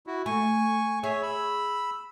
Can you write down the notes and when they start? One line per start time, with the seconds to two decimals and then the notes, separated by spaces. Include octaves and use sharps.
0.07 E4 F#4
0.26 A3 G#5 C#6
1.03 G#4 C#5 E5
1.23 B5 E6